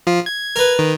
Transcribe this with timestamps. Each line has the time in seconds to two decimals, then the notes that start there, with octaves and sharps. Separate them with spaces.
0.07 F3 F4
0.26 G#6
0.56 A#4 B4
0.79 D#3